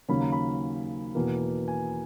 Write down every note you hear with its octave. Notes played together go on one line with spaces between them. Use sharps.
D#2 C#3 F#3 A#3 C#4 B5
A#5
B5
E2 B2 A#3
G#5